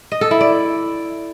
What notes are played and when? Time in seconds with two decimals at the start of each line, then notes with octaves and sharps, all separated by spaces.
0.12 D#5
0.21 A4
0.31 E4
0.41 D5